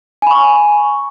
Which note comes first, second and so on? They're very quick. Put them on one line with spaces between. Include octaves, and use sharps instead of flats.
G#5 B5 C#6